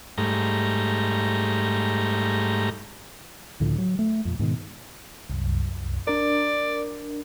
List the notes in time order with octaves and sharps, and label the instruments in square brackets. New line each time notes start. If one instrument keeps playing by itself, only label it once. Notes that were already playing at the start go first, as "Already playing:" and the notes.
[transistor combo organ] G#2 G3 A3 A#5
[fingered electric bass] C#2 A2 D3 F3
F#3
A3
F2 A#2
G#2 B2 D#3
[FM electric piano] C2 F#2
[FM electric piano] D4 A#4 [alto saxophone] D5